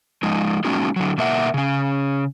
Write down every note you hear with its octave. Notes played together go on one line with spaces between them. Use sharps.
F3 G#3 D#4
F#3 G#3 A#3 C#4 D#4 F#4
D3 F#3
B2 A#3 A#4 E5 F#5
C#3 C#4